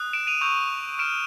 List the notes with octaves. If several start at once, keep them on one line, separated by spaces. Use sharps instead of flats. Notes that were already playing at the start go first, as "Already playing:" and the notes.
Already playing: D#6 F#6
D7 E7
D#7 F7
C#6 E6 G6 D#7 F7
C#6 F6 D7 E7